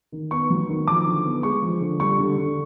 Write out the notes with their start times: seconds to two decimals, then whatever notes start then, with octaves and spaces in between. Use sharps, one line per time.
0.12 D#3
0.31 B3 C#6
0.50 F#3
0.69 D#3
0.88 F3 D6
1.06 D3
1.25 B3
1.43 G#3 C#6
1.62 F3
1.80 D3
2.00 G3 C#6
2.18 D3
2.37 D3